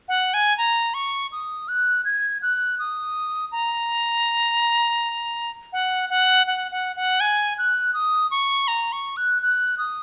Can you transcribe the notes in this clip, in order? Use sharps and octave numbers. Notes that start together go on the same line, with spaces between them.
F#5
G#5
A#5
C#6
D#6
F#6
G#6
F#6
D#6
A#5
F#5
F#5
F#5
F#5
F#5
G#5
F#6
D#6
C#6
A#5
C#6
F#6
F#6
D#6